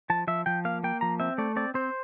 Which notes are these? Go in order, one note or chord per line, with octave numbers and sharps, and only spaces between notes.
F3 A5
F3 E5
F3 G5
A#3 F5
A#3 G5
F3 A#5
C4 E5
A3 D5
C4 D5
C4 C5